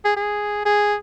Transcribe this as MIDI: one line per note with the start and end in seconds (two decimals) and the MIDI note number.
0.05 0.12 68
0.16 0.65 68
0.65 0.95 68